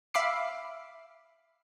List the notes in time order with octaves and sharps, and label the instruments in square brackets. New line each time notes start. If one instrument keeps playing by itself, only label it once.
[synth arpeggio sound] E5 F5 B5 D6 C7